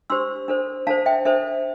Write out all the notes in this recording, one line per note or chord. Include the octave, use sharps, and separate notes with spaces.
D4 G4 C5 C6 E6
D4 A4 C5
D4 A4 C5 F5 A5
E5 G5
D4 A4 C5 E5